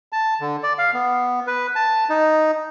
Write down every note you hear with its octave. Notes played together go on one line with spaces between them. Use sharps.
A5
D3
D5
F5
B3
B4
A5
D#4